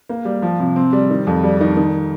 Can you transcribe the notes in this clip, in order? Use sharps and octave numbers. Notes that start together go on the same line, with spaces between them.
A#3
G3
F3
C3
C4
G3
D#3
F2
G3
D#3
D#3